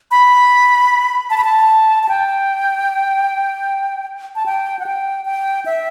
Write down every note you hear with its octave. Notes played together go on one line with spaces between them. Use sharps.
B5
A5
B5
A5
A5
G5
A5
G5
F#5
G5
G5
E5